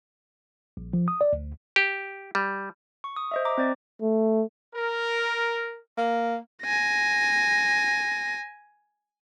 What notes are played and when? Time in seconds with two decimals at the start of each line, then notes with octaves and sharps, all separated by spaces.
0.77 A#1
0.93 F3
1.08 D#6
1.21 D5
1.33 D2
1.76 G4
2.35 G3
3.04 C#6
3.16 D#6
3.31 C5 D#5 E5
3.45 A#5 D6
3.58 C4 C5 D5
4.02 A3
4.75 A#4
5.98 A#3
6.62 G#5 A#6